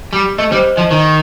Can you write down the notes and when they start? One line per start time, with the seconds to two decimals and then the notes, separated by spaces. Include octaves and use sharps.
0.13 G3
0.38 A3 D#5
0.51 G3 C5
0.77 F3 D#5
0.90 D#3 D#5